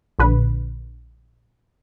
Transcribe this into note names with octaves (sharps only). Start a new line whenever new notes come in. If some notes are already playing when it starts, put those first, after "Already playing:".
A#1 D3 B4